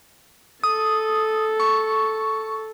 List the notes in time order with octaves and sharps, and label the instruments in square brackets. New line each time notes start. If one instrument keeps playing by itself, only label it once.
[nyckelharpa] A4 [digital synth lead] D#6
[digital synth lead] C#6